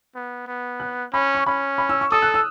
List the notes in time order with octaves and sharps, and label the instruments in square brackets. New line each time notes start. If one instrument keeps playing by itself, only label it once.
[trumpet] B3
B3
[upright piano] F#6
[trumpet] C#4 [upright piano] B5
[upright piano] C#6
[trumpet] C#4 [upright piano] B5
[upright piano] B5
E6
C#6
[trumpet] A4 [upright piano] D#6
[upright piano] F#6
E6